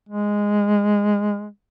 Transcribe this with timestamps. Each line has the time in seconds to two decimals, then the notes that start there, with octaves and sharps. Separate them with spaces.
0.09 G#3